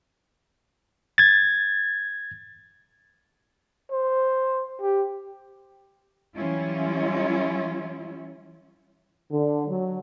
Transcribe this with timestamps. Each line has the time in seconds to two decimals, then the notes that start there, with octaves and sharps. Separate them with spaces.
1.18 G#6 A6
3.91 C5
4.81 G4
6.38 E3 F#3 G3 C#4 E4 F4
9.30 D3
9.66 F#3